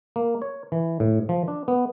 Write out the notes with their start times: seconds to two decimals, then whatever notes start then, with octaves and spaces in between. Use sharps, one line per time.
0.16 A#3
0.42 C#5
0.72 E3
1.00 A2
1.29 F3
1.48 D4
1.68 B3